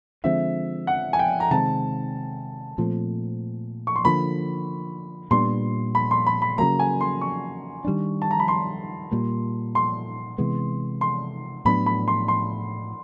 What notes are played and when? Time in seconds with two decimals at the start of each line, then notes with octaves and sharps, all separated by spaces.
0.24 D3 F3 G#3 C4 E5
0.87 F#5
1.13 G#5
1.19 G5
1.40 A#5
1.51 C3 D#3 G#3 C4 A5
2.78 A#2 F3 A3 C4
3.87 C#6
3.96 C6
4.05 D3 F3 A#3 B5
5.31 A#2 G3 B3 D4 C6
5.95 B5
6.11 C6
6.27 B5
6.42 B5
6.58 C#3 F#3 A#3 A#5
6.79 G#5
7.01 C6
7.21 C#6
7.85 D#3 G3 B3 D4
8.22 A5
8.31 A#5
8.39 B5
8.48 C6
9.11 A#2 G3 A#3
9.75 C6
10.38 C3 E3 G#3 B3
11.01 C6
11.65 A2 F#3 B3 D4 B5
11.86 B5
12.08 C6
12.28 C6